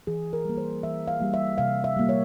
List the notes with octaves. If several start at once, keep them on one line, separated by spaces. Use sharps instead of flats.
E3 G#4
A#4
G3 A#3
C5
E3 E5
F5
G3 A#3
E5
C3 F5
E5
G3 A#3
C#5